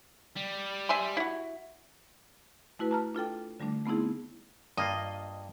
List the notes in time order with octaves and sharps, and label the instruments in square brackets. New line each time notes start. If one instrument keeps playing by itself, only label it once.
[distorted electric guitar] G3
[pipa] E5 G#5 C6
E4 F#4
[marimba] A3 E4 F#4 B4
A5 A#5 F6
D4 F4 A4 G5
D3 G3 A3 D4
A3 B3 C4 D#4 E4 G#4
[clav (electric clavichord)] G2 A#3 F4 [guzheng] D#5